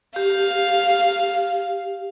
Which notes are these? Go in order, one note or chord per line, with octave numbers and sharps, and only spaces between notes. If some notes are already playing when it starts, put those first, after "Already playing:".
G4 F5